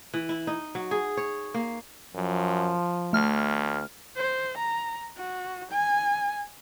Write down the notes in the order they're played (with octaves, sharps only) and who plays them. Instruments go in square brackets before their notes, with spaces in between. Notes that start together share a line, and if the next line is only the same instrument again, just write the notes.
[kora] E3
E4
D#4
F#3
G#4
C#5
A#3
[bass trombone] F#2 [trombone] F3
[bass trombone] D2 [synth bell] A3 F6
[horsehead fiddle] C5
A#5
F#4
G#5